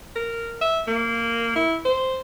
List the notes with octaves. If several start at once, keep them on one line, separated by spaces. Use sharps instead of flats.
A#4
E5
A#3
E4
C5